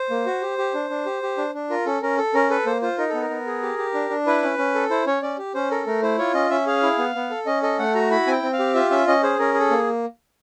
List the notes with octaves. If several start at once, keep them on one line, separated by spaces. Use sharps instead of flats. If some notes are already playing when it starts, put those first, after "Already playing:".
Already playing: C5
A#3
F#4
G4
G4
D4
D4
G4
G4
D4
D4
F4 A#4
C#4 A4
C#4 A#4
A4
C#4 A#4
A4 B4
A#3 C5
F4 C5
D#4 A#4
B3 A4
A#4
B3
G#4
G4
G4
D4
D4
E4 B4
C#4
C#4
A4
E4 C5
C#4 C#5
C#4 D5
G4
C#4 C5
A4 A#4
A3 A#4
E4 C5
F4 C#5
C#4 D#5
C#4 E5
G#4 F5
E4
B3
B3
A4
C#4 D#5
A4 D#5
A3 F#5
F#4 A#5
E4 B5
C4 G#5
G5
C4
F5
G4
F4 E5
C#4 E5
C#4 D#5
G#4 C5
C#4 A#4
G#4
A4
A#3